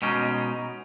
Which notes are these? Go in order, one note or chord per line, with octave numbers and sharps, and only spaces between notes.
B2 G#3 C#4 D#4